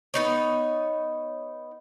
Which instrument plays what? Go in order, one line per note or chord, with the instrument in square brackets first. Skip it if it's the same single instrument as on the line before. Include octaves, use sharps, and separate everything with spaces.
[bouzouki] B3 D#4 C#5